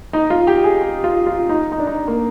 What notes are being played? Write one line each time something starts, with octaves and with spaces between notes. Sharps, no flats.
D#4
F4
G4
G#4
G4
F4
F4
D#4
D#4
D4
D#4
A#3